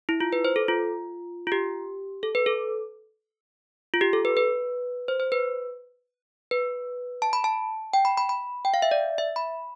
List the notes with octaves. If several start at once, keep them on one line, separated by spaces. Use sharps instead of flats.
E4
F4
B4
C5
A4
F4
F4
G4
A4
B4
A4
F4
G4
A4
B4
B4
C5
C5
B4
B4
A5
B5
A5
G5
B5
B5
B5
G5
F5
E5
D5
E5
B5